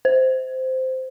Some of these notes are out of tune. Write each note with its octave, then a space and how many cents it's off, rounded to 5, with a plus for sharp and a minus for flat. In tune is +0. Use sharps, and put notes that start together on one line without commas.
C5 -10